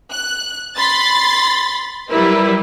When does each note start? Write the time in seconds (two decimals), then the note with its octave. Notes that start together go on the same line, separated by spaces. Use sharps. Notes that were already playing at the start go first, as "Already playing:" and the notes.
0.11 F#6
0.76 B5 C6 A6
2.10 F#3 G3 E4 A#4 B4